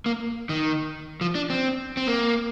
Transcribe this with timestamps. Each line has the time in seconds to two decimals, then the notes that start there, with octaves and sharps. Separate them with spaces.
0.06 A#3
0.49 D#3
1.21 F3
1.35 D4
1.50 C4
1.97 C4
2.07 A#3